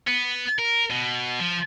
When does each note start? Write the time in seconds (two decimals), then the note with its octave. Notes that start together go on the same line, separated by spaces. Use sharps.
0.07 B3
0.59 A#4
0.90 B2
1.39 F3